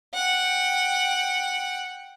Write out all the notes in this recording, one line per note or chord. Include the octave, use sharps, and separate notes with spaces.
F#5 G5